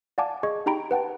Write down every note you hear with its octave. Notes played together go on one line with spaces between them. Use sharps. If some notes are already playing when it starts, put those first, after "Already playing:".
D5 F5 F#5 G#5 A5 D6
G#4 D#5 C#6 G#6
D#4 G4 G5 A#5 B5 D7
B4 F#5 G5 A5